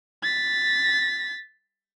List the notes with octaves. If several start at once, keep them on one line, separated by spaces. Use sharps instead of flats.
A6 B6